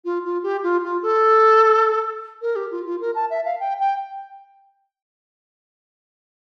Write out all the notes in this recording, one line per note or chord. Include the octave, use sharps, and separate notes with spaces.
F4
F4
G4
F4
F4
A4
A#4
G4
F4
F4
A#4
A5
E5
F5
G5
G5